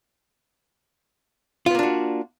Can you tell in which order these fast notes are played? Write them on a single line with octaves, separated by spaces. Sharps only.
F4 B3 A#3 D4 F#4